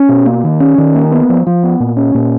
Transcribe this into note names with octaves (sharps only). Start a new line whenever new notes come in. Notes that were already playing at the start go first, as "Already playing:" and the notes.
Already playing: C#4
B2
A#3
D#3
C#4
D#3
A#3
B3
F3
F3
B3
A#2
C#4
A#2